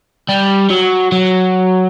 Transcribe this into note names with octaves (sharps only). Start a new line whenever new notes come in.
G3
F#3
F#3